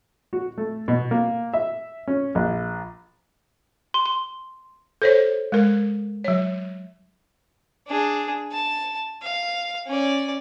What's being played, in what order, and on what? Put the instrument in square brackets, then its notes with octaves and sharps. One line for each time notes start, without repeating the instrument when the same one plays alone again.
[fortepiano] F#4
A3
B2
A#3
E5
C#4
A#1
[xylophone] C6
C6
[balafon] A4 C5 C#5
G#3 A#4
F#3 C#5
[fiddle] D4 G#4
A5
F5
C#4 D5